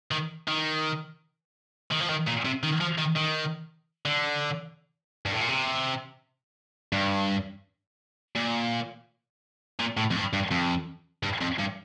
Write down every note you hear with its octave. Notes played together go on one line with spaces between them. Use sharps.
D#3
D#3
D#3
F3
D#3
A#2
C3
D#3
F3
D#3
D#3
D3
G2
A2
A#2
C3
G2
A#2
A#2
A2
F2
G2
G2
F2
G2
F2
G2